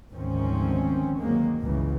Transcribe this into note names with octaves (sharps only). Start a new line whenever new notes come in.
G#1 D2 D#3 F3 C4 C#4
G2 D#3 F#3 G#3 A#3
G1 C#2 A2 C#3 E3